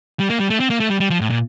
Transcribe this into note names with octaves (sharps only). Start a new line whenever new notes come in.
G3
A#3
G3
A3
C4
A#3
A3
G3
G3
F3
A2
A#2